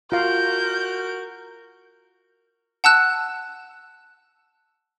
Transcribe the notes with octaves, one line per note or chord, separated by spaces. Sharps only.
F4 F#4 A#4 F5 G6
F#5 A5 E6 F#6 E7